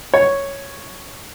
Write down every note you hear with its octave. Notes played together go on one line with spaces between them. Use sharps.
C#5